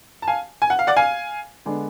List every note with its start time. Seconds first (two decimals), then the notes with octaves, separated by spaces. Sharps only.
0.22 A5
0.28 F5 G#5
0.62 G#5
0.70 F#5
0.79 F5
0.87 D5 F#5
0.96 F5 G#5
1.66 D3 G#3 B3 D4